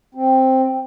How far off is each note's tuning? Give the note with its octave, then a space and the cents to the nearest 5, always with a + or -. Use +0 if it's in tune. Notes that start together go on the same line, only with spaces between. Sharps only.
C4 +5